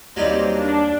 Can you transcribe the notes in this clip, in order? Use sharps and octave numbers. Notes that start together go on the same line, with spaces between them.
D#2 F#3 G3 A#3 C4 D#4
D4